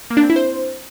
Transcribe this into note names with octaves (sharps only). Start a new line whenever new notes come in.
A#3
D4
C4
E4
C5